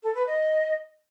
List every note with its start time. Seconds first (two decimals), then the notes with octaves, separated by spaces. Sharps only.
0.03 A4
0.15 B4
0.27 D#5